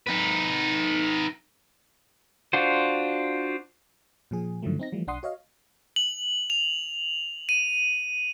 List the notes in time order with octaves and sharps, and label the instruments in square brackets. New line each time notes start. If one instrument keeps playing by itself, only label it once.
[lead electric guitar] D#4 B4
[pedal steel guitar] D4 F4 F#4 C5
[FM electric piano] A#2 F3 G#4
G2 D3 D#3 F3 F#3 A3
C4 D#4 A#6
E3 F3 G3 A3
B1 D4 F#5 C6 D#6
F#4 C#5 D#5 F5
[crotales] F#7
F7
D#7